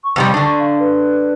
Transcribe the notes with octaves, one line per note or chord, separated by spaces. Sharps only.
C#6
F2 C3 G3
D3 D4
F5
B4